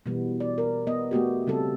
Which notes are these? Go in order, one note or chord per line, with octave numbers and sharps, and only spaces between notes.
B2 E3 G3 B3
D5
A#4
B3 D#5
A3 B3 F#4 G4
C#3 G3 C4 A4